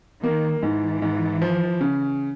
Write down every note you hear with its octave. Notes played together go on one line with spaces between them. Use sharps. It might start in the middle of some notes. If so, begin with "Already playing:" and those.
D#3 A#3
G#2 E3
G#2
F3
C#3